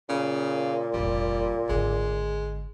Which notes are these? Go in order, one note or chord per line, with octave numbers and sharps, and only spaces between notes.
A#2 C#3
F1 A#1 G3
G#1 D3 G#3